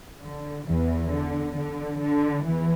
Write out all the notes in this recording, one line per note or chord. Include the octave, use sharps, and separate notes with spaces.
D3
E2 E3
D3
D3
D3
E2 E3